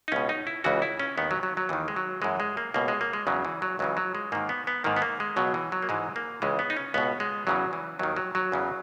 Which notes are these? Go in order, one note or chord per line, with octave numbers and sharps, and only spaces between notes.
D#4
C#2 B2 C#4
D#4
E4
C#2 C#3 E3 F#4
E4
C#4
D#2 D#3 B3
F#3
F#3
F#3
D#2 D#3 E3
G#3
F#3
F#2 E3 G#3
G#3
A#3
C#2 B2 A#3
G#3
A#3
G#3
E2 C#3 E3 F#3
E3
F#3
C#2 C#3 E3 F#3
F#3
G#3
G#2 D#3 A#3
B3
B3
G#2 D#3 A#3
B3
A#3
G#3
C#2 B2 F#3
E3
F#3
A#3
G#2 E3 G#3
A#3
C#2 C#3 E3 G#3
B3
D#4
C#4
C#2 B2 B3
G#3
E2 C#3 E3 F#3
E3
D#2 D#3 F#3
F#3
F#3
E2 C#3 E3